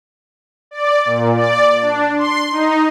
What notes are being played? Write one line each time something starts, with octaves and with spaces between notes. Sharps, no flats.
D5
A#2
D5
D4
C6
D#4